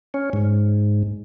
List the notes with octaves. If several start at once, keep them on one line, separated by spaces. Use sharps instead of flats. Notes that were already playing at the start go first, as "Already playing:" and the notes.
C#4
G#2